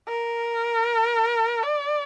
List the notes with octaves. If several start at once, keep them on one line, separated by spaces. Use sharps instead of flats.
A#4
D5